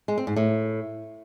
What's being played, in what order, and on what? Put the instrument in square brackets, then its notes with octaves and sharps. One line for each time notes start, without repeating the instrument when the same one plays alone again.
[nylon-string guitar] G#3
C4
G#2
A2